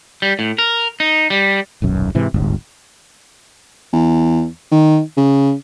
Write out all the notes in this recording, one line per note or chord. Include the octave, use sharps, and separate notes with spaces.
G3
A2
A#4
D#4
G3
D#1 B1 F#2
G#2 C3 E3
D1 G1 G#2
E2
D#3
C#3